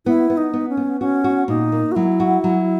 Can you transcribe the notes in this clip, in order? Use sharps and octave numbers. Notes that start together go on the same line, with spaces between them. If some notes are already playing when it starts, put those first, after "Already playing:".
B3 E4
B3
D#4
B3
C#4
B3
C#4 F#4
F#4
A#2 D#4
A#3
F#4
F#3 E4
F#4
F#3